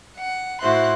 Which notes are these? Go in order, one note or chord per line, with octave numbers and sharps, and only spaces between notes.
F#5
A2 E4 F#4 C5 C6 F#6